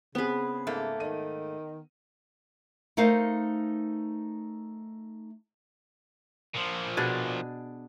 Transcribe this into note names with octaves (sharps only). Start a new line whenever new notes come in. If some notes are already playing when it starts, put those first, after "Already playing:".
C#3 B3 C4 G#4 B4
G#2 A3 A#3
D#3 D#7
A3 D#4 A#4 C5 F5
A#2 F3
B2 D4 G#4